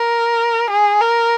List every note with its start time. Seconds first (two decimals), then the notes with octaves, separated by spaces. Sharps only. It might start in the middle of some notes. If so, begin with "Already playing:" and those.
Already playing: A#4
0.70 G#4
1.01 A#4